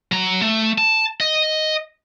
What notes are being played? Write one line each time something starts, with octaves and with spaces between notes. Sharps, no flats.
F#3 A#5
A3
A5
D#5